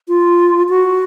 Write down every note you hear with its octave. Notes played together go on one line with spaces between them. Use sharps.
F4
F#4